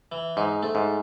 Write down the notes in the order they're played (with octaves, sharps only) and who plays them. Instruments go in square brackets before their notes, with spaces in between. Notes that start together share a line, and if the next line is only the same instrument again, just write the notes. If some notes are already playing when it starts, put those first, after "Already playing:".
[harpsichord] E3
[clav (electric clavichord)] G#2 [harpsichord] D#4
[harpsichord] A3
[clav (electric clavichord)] G#2